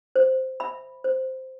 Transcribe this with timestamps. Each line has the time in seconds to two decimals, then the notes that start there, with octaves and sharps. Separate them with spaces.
0.16 C5
0.60 E5 B5
1.04 C5